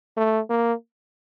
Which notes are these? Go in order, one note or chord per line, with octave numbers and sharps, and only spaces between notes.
A3
A#3